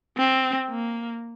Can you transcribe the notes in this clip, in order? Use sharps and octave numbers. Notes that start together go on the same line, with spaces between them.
C4
A#3